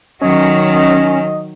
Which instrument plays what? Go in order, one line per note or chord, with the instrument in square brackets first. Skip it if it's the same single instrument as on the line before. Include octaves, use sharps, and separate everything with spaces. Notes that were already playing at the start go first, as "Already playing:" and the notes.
[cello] D#3 F#3 [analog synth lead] C#4 [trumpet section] D#5